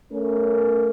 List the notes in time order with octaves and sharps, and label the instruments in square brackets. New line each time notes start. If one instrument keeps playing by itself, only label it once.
[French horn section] A3 C#4 A#4